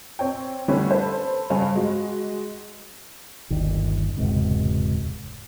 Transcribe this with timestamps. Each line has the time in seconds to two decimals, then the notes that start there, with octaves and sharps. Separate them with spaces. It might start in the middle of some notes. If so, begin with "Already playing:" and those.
0.19 C4 C#5 G5
0.68 D3 E3 G3 A3 C4 C#4
0.90 A4 B4 C5 A5
1.50 G2 C#3 C5 F5 G#5
1.75 G#3 F#4
3.50 G1 D#2 D#3
4.17 E1 C#2 G#2 C3